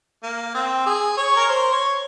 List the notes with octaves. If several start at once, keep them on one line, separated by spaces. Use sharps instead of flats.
A#3
C4
G#4
C#5
A#4
C5
C#5